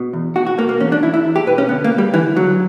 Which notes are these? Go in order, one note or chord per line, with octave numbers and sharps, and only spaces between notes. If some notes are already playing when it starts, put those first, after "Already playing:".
Already playing: B2
E2
B2 F#4
F#4
B2 A#3
A#3
E2 C#4
D4
E2 E4
E4
E2
G4
B2 B4
C#4
D3 B3
A#3
D2
G3
D3 E3
D3 F#3